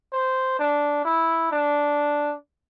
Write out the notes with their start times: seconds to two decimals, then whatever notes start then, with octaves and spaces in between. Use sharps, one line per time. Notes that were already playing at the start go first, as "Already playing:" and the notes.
0.12 C5
0.59 D4
1.05 E4
1.51 D4